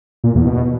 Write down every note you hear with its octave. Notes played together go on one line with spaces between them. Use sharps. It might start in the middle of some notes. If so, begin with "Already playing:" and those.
A#2
E2
B2